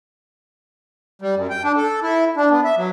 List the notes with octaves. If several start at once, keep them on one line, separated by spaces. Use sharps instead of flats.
G3
F#2
G5
D4
A4
E4
D4
B3
E5
F#3